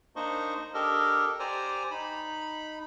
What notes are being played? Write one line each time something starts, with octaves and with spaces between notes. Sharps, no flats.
A#3 D4 D#4 C5 D#5 C#6
D4 G4 A4 A#4 D#5
G4 C5 D5 G#5 A#5
D#4 B5